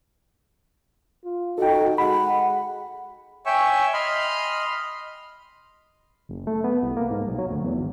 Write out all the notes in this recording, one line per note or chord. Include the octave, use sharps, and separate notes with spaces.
F4
D#4 F#4 A4 G5
G#3 F#5 B5
C#5 E5 G5 G#5 C#6 E6
D#5 B5 C6 F6
F#1
A3
B3
C2
A#3
G#2
B1
F#3
D2
E2
G#1